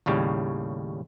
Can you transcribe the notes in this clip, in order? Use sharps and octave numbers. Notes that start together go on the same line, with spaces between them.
D#2 A2 C#3 G3